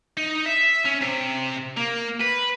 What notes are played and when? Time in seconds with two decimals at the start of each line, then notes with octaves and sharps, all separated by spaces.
0.17 D#4
0.46 E5
0.85 C#4
1.01 C3
1.77 A#3
2.21 B4